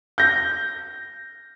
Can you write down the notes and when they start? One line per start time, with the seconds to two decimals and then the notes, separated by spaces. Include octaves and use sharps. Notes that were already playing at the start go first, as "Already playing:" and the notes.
0.18 G6 A#6